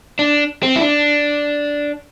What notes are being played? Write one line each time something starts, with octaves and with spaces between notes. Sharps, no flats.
D4
C4
E4
D4